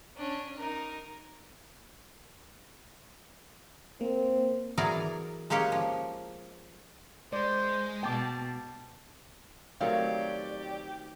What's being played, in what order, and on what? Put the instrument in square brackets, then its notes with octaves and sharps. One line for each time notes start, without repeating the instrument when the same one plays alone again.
[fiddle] C#4 D4
D#4 A#4
[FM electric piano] A#3 [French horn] C4
[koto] E3 F#3 G#4 A#4 D5
G#3 A#3 C#4 G4 C#5
F3
[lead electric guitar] G#3 [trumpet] C5 [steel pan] D5
[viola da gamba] B2 [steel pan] G5 D6 [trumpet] A5
[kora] D#3 A3 C4 [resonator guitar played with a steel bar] F#3 C#5 F5 [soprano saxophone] G4 [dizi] D5